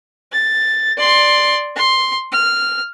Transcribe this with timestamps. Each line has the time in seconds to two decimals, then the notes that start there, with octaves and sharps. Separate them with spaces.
0.32 A6
0.97 D5 C6
1.76 C6
2.32 F6